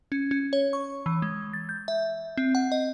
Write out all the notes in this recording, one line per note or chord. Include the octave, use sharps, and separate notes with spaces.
C#4
C#4
C#5
C#6
E3
G#3
A6
G6
E5
C4
F#5
D#5